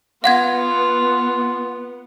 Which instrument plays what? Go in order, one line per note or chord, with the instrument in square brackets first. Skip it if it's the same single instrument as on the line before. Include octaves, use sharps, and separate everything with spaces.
[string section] B3 [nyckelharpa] F4 [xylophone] F5 F#5 G#6